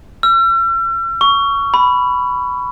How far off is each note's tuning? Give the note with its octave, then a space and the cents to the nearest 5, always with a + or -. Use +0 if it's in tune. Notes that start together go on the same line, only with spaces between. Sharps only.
E6 +45
C#6 +15
B5 +10